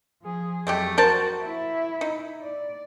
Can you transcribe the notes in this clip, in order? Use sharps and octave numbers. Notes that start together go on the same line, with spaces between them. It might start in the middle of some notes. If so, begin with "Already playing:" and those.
F3 G#4
F2 F#3 G#3 A3 G4
F#4 A#4 C5 A5
E4 E5
D#4
D5